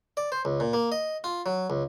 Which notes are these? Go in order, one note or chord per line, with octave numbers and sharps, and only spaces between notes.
D5
C5
C#2
A#2
A#3
D#5
F4
F#3
C#2